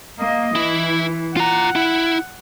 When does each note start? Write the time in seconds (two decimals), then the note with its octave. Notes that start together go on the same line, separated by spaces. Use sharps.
0.19 A#3 D#5
0.55 E3 E4
1.37 F4 F#5 A#5
1.75 E4